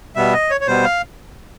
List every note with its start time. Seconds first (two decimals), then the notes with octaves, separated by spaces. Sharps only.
0.16 B2 G3 B3 E5
0.33 D#5
0.51 C#5
0.61 C#5
0.67 B2 G3 B3 C5
0.84 F5